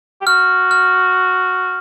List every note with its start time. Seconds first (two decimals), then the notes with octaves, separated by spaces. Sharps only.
0.21 G4
0.26 F#4 F6
0.71 F6